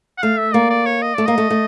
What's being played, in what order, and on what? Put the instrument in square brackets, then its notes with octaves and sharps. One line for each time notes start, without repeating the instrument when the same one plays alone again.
[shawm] F#5
[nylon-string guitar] A3 [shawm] F5
[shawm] E5
[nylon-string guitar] A#3 [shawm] D5
[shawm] D5
C#5
D#5
[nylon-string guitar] A3 [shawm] D5
[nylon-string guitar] A#3 [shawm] D#5
[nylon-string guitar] A3
A3